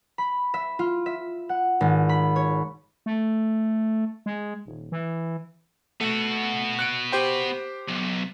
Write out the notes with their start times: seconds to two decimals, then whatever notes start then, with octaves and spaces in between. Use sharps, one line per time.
0.18 B5
0.54 E5
0.79 F4
1.06 E5
1.49 F#5
1.81 G#1
2.09 B5
2.36 C#5
3.06 A3
4.26 G#3
4.66 D#1
4.92 E3
6.01 A3 B3 F#4
6.79 F#6 C#7 D7
7.12 G4 C5 G5
7.88 B1